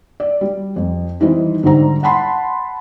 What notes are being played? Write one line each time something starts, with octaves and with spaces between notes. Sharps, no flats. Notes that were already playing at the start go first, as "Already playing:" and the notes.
D5
G3
F2
D#3 E3 G3 C4 D#4 D#5
G#2 D3 G3 C5 A#5
F#5 A5 B5 C6